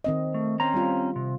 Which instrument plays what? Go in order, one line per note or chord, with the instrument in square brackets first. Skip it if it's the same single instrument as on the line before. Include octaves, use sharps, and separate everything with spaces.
[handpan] D#3 C4 D#5
[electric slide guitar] A3
C4 C#4 A#5
[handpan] G3 F4
[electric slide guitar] C3